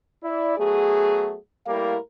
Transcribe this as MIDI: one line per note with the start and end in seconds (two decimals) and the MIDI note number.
0.23 0.57 64
0.23 0.57 74
0.58 1.36 54
0.58 1.36 57
0.58 1.36 59
0.58 1.36 68
1.66 1.96 45
1.66 1.96 55
1.66 1.96 58
1.66 1.96 64
1.66 1.96 70
1.66 1.96 77